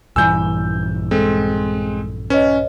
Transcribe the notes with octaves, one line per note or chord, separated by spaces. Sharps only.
A#1 G2 E3 G#5 E6 G6
G#3 C4 A4
C#4 B4 C#5 D#5